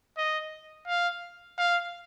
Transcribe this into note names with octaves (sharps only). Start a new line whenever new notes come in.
D#5
F5
F5